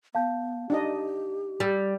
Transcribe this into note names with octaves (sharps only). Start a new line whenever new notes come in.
B3 F5 A5 G6
D4 D#4 G4 D#5
G3